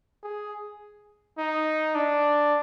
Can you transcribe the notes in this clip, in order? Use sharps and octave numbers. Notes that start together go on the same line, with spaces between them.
G#4
D#4
D4